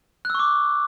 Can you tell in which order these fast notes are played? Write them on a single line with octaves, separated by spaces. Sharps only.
F#6 E6 C#6 D6